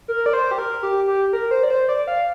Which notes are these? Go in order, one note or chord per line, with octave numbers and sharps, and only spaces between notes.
A#4
D5
C5
G4
A#4
G4
G4
A#4
C5
D5
C5
D5
F5